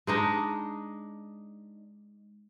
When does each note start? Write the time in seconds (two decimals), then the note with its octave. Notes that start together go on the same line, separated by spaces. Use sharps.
0.07 G#3 D4 D#4